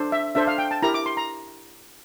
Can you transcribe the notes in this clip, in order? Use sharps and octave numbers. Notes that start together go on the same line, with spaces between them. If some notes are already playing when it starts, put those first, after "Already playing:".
Already playing: D4 A4 C5
E5
D4 A4 C5 E5
F5
G5
A5
E4 G4 A#4 A#5
D6
C6
A#5